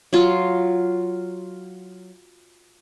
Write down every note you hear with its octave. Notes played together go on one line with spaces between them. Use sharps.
F#3 F4